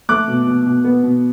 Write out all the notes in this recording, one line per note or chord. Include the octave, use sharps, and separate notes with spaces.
A3 D6 F#6
B2
B2
B2
B3
B2